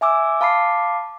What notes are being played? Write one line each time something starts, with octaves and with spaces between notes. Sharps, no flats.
E5 G#5 D6 E6
F5 A5 B5 D6 C7